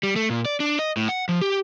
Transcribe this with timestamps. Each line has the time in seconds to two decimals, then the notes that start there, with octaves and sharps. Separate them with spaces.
0.03 G3
0.16 A3
0.30 A#2
0.45 D5
0.60 D4
0.79 D#5
0.97 A2
1.09 F#5
1.29 F3
1.41 G4